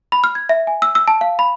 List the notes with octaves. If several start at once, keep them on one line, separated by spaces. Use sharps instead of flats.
B5
F6
G#6
E5
G#5
E6
E6
A5
F5
B5